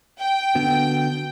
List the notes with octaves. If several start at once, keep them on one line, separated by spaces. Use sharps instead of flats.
G5
D3 B3 F#4